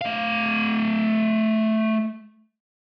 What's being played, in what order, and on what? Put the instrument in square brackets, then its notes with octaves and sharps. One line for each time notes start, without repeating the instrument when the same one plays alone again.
[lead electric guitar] A3 F5